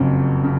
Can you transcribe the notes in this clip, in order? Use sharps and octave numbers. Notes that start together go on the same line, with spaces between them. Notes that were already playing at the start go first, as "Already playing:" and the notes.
Already playing: F#1 F2 C#3
C#3